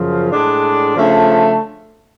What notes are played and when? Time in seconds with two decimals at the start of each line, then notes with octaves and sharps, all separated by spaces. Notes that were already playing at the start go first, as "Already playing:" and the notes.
Already playing: F#2 C#3 F3
0.30 A2 G#3 D4
0.95 C#3 F3 A3 D4